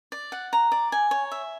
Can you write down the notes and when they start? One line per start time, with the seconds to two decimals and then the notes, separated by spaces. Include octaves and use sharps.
0.12 D5
0.32 F#5
0.53 A#5
0.72 D5
0.92 G#5
1.11 C#5
1.32 E5